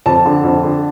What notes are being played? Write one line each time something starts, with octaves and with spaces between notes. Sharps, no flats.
F2 A5
D3
F2
D3